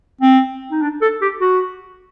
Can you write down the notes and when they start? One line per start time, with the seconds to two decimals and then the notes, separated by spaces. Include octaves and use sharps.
0.21 C4
0.71 D#4
0.82 D4
1.02 A4
1.22 G4
1.41 F#4